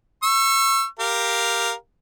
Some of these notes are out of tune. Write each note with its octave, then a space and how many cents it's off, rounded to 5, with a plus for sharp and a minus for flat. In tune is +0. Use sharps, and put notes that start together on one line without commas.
C#6 -20 E6 +30
G4 +0 A#4 +0 F5 +0